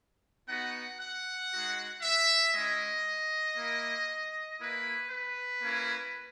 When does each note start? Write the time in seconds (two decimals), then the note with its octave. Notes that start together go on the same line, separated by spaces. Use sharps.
0.49 B3 D#4 F#4 F#5
1.00 F#5
1.52 G#3 D#4 F#4
2.02 E5
2.55 G#3 C#4 E4 D#5
3.57 A#3 E4
4.60 A#3 E4 B4
5.11 B4
5.62 A#3 C#4 E4